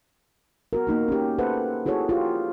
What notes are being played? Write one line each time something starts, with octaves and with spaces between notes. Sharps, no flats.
B3 F#4 A#4
A#3 D#4 F#4
C#4 G4
A4 B4 C5 E5 F#5
E4 F#4 G#4 A4 C#5
F4 G4